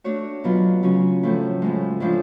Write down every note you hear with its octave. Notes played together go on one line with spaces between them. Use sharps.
A3 D4 F#4 C#5
B2 F#3 B3 F4
C#3 F#3 C#4
A2 F3 A3
A2 F3 G#3
A2 F3 G#3 D4 F4